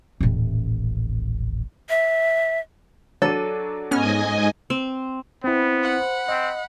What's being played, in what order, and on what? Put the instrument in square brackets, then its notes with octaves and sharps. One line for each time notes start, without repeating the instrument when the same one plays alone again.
[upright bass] D#1 A1
[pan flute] E5
[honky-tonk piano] F#3 D4 D#7 [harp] A4
[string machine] G#2 D#5 G#5 [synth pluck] B3 C#4 F6
[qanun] C4
[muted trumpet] B3 [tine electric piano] C4 E4 [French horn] C5
[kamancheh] F#5 B5
[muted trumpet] C4 [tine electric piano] D#5